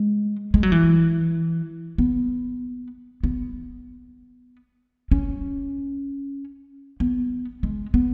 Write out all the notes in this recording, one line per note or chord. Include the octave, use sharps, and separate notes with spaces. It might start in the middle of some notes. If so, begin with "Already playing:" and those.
Already playing: G#3
G#3
F#3
E3
B3
B3
C#4
B3
G#3
B3